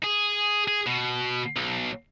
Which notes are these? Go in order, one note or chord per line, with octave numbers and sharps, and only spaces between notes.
G#4
G#4
B2
B1